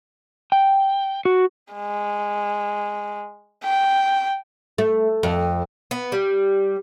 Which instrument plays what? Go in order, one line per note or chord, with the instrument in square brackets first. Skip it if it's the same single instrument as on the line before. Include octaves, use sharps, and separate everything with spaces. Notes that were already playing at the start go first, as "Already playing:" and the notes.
[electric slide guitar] G5
F#4
[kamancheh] G#3
G5
[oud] A3
F2
[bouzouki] B3
G3